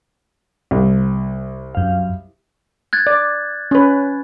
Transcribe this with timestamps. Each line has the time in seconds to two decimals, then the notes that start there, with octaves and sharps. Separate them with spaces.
0.71 C2
1.75 F#2 F5
2.93 F#6 G#6 A6
3.07 D5
3.71 C#4 B4